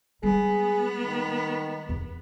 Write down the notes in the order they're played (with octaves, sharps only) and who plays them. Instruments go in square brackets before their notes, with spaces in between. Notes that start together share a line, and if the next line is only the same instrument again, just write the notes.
[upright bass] G3 G#3 [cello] B3 [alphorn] G#4
[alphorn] D#3
[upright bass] E2